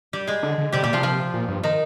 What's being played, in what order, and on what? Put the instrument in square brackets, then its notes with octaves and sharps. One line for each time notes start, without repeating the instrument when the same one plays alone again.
[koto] G3 G4
G#3 G#4
[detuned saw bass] D3
D3
[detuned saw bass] C3 [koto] G3 G4
[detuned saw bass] A#2 [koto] G3 G4
[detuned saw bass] C3 [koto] F3 F4
[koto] F3 F4
[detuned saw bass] A#2
G2
[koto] D#3 D#4